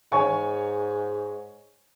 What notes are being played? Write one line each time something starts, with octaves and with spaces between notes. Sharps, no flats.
G#2 C#5 G#5 C#6